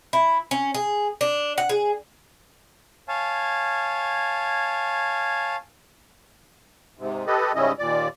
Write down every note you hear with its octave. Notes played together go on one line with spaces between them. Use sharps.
E4
C#4
G#4
D4
F#5
G#4
C#5 F5 G#5 A5
G#2 C3
G4 A4 B4 D#5
G#2 C#3 G3 C#4 E4 D#5
D#2 A#2 D5